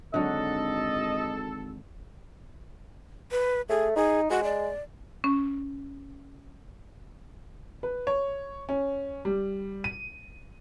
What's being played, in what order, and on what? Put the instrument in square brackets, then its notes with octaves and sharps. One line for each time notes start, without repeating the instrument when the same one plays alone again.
[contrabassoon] G#1 [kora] D3 F#3 F#4 [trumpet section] A4 [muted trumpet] D#5
[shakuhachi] B4
[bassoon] A3 [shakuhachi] G#4
[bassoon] D#4 [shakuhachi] G#4
[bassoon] G#3 [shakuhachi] F#4
[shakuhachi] D5
[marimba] C#4
[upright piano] B4
C#5
C#4
G3
D#7